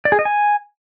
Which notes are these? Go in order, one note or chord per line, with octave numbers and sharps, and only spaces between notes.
D5
G#4
D#5
G#5